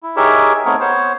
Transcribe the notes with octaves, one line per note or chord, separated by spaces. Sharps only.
E4
D#4 G4 G#4 A#4 C#5 E5
A3 B3 C4 D#4 A#4 C#5
B3 C5 C#5